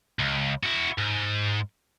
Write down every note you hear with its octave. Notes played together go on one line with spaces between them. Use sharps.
C#2
E4 F#4
G#2